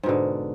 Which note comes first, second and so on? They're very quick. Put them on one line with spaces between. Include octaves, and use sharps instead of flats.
G#2 B2 D3